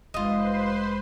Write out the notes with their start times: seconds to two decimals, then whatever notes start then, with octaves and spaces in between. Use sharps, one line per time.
0.14 F1 G#3 F4 B4 C5 D#5 C6